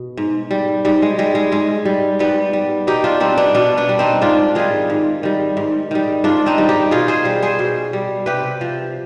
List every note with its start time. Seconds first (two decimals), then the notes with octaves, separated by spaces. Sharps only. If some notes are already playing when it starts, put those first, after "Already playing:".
Already playing: B2
0.17 G#2
0.51 G3
0.85 G#2 G3
1.02 G#3
1.18 G3 G#3
1.35 G#3
1.52 G#2 G#3
1.85 G3
2.19 G#2 G3 B3
2.53 G3
2.87 B2 D#4 G4
3.04 D4 F4
3.20 G3 C4 D#4
3.37 B3 D4
3.54 B2 B3 D4
3.77 B3 D4
3.89 G3
3.99 C4 D#4
4.21 G#2 D4 F4
4.55 D#3 G3 F4 G#4
4.90 G#2
5.23 D#3 G3
5.57 G#2
5.91 D#3 G3
6.24 G#2 D4 F4
6.46 C4 D#4
6.58 D#3 G3
6.69 D#4 G4
6.91 B2 F4 G#4
7.08 G#4 C5
7.25 G3
7.42 G#4 C5
7.59 B2
7.93 G3
8.26 C3 G4 B4
8.61 F3